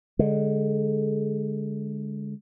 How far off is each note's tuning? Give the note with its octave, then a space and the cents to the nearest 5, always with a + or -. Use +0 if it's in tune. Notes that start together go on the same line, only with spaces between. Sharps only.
D3 -15 G#3 +0